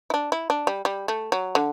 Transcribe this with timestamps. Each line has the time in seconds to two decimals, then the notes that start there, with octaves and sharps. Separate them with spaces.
0.10 E4
0.14 D4
0.32 E4
0.50 D4
0.67 G3
0.85 G3
1.08 A3
1.32 F#3
1.55 D3